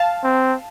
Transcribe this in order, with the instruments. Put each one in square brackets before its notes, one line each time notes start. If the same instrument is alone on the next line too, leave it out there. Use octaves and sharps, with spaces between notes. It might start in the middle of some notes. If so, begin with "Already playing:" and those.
Already playing: [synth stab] F5 A5
[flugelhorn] C4